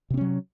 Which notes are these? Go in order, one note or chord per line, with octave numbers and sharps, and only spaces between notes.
C3 F#3 C4 C#4